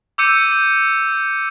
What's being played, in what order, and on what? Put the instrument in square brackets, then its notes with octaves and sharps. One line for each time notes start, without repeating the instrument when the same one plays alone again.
[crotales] D6 E6 G6 C#7 D#7